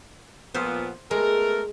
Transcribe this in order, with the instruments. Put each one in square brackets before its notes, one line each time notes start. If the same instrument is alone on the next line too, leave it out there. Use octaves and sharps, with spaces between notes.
[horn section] A#2 F3 B3 [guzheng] C5
[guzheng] G#3 [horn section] A3 B3 A#4